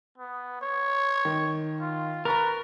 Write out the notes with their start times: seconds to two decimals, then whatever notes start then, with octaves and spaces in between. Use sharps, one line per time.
0.18 B3
0.62 C#5
1.25 D#3
1.80 F4
2.25 A#4 B4 A#5 C#6 A6